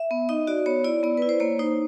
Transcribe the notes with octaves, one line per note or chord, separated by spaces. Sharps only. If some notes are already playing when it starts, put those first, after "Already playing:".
Already playing: E5
B3
D#4 D#5
F#4 D5
B3 C#5
E4 D5
B3 D5
E4 B4
C5
A#3 C#5
D#4 C5